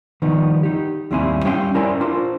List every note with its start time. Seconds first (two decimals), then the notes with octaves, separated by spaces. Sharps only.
0.22 D#3 F3 G3 B3 D#4
0.63 D#4 G4
1.11 D#2 G3 A#3 C4 E4 G#5
1.45 G3 C#4 F5 G5 G#5 C6
1.74 C#4 E4 A#4 C5 D5 G#5
2.01 D4 F4 A#4 C5